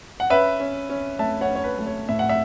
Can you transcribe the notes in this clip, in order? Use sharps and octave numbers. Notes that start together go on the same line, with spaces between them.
F#5
C#4 B4 E5
C#4
C#4
A3 E5 A5
C#5 F#5
C#4
C#5
B4
A3
C#5
A2 E5
F#5
E5